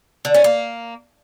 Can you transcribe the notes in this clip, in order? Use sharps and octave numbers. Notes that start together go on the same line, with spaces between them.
D3
C#4
A#3